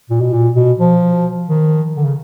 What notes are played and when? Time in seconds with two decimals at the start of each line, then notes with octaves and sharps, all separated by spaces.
0.10 A#2
0.21 B2
0.33 A#2
0.56 B2
0.80 F3
1.50 D#3
1.97 D3
2.05 C#3